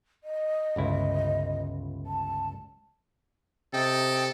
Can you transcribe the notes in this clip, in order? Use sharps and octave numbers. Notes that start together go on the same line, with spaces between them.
D#5
G1 C#2 E4
A5
C3 A4 D#5 G5